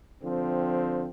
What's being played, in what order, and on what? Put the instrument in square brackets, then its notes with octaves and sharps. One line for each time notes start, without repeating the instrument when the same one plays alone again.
[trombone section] D3 F3 C4